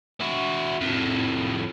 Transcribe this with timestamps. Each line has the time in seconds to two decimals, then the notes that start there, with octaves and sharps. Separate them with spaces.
0.20 E4 F#4
0.81 F2 A2